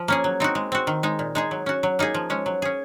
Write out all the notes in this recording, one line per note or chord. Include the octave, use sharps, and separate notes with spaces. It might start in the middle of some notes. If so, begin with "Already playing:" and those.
Already playing: F3
A#3 C#4 G#4
F#3
C4 D#4 F#4
G#3
C4 F#4
D#3
G#3 D#4
A#2
G#3 D#4 G#4
F#3
C#4 F#4
F#3
A#3 D#4 G#4
F3
G#3 C#4
F#3
C#4 G#4